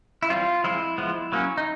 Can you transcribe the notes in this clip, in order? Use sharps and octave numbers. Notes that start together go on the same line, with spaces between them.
E4
E3 G3 C4 F4
F3 G#3 C4 E4
F3 G#3 B3
F#3 A#3 C#4
D#4